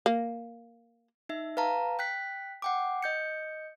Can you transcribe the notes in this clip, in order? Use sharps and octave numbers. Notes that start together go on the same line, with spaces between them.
A#3
D#4 E5
B4 F5 A5 A#5
G5 F#6 B6
F#5 G5 D6
D#5 G6 C#7